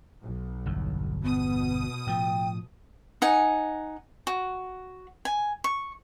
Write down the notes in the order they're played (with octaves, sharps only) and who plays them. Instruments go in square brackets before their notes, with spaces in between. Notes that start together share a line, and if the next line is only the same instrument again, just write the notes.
[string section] B1
[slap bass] G1 E2
[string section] B2 D#6 [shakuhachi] B3
[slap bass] A2 F3 [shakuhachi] G5
[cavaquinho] D#4 F#5 G#5
F#4
G#5
C#6